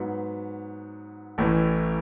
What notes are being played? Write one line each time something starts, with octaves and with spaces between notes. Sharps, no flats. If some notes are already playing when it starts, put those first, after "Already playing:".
Already playing: G#2 F#3 B3
A1 A2 E3